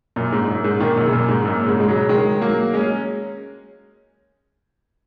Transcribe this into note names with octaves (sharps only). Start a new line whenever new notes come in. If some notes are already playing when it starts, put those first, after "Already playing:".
F#2 A#2
G#2
F#2
G#2
A#2 D#3
F#2
C#3
F#2 A#2
G#2
F#2 A#2
G#2 C#3
G#3
C#3 F#3
D#3 G#3
F#3 A#3
G#3 C#4